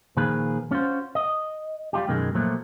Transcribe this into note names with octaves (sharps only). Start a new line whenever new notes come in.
A#2 D#3 F3 G#4 B4
C#4 F4 F#4 C5
D#5
G3 F4 G4
F#2 B2 D#3 G#3
A#2 F3 F#3 A3